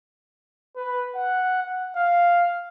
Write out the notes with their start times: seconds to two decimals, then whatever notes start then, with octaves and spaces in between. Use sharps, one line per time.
0.76 B4
1.15 F#5
1.63 F#5
1.96 F5